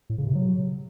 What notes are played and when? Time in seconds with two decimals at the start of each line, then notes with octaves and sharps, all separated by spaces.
0.10 A2
0.18 C#3
0.27 C3
0.35 F#3